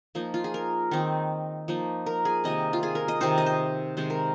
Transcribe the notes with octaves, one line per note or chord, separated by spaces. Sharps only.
F3 A#3 D#4
F4
G#4
A#4
D#3 C4 D#4
F3 A#3 D#4
A#4
G#4
C3 D#3 A#3 D#5
F4
G#4
A#4
D#5
C3 D#3 C4 D#4 C5
D#5
C5
C3 D#3 G#3 C4 C5
A#4